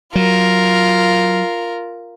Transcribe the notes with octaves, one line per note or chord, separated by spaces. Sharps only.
F#3 F4 A#4